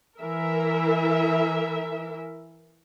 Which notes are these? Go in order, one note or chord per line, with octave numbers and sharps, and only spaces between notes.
E3 A#4 E5